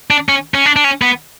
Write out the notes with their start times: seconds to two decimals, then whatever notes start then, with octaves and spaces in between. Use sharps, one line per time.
0.11 D4
0.29 C#4
0.54 C#4
0.66 D4
0.76 D4
0.84 C#4
1.02 B3